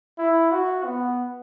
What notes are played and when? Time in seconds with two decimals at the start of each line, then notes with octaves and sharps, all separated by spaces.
0.18 E4
0.51 F#4
0.84 B3